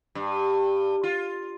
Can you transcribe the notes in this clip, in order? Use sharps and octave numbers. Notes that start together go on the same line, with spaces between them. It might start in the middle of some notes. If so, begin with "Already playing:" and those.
G2
F4